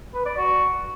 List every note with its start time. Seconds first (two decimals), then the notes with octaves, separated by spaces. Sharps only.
0.14 B4
0.26 D5
0.37 F#4